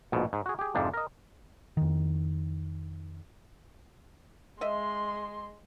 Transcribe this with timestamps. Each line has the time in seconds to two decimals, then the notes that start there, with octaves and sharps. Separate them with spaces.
0.12 A#1 G#2 B2
0.33 G#2
0.46 F#4 G#4
0.59 G4 G#4
0.75 F2 G#2 C3 F3 D4
0.94 A#4 D#5
1.77 F2 D#3
4.61 G#3 D#5 E5 C6